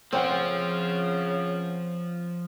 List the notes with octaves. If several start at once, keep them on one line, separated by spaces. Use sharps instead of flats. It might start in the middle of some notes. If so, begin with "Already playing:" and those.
C#3 F3 C4 C#5 F#5 G5